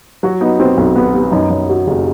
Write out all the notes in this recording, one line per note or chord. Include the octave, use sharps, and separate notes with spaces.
F#3 F#4
B3 D#4
B3 C4
B1
B3
B3
F#2 D#4
F#2
F#3
F#1